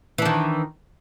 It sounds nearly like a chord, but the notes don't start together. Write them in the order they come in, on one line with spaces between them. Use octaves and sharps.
E3 D4 D#3